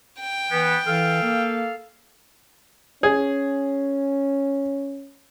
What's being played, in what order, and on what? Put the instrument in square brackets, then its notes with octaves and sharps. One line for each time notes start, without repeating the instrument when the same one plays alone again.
[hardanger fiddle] G5
[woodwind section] E3 B3
[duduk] E3 [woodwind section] A4 F5
[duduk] A#3
[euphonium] C#4 [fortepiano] G#4